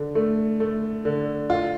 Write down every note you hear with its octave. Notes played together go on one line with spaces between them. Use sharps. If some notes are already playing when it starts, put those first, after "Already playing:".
Already playing: D3
A3
A3
D3
F4